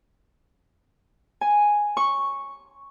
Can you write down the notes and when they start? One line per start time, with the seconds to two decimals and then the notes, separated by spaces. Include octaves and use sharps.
1.41 G#5
1.97 C#6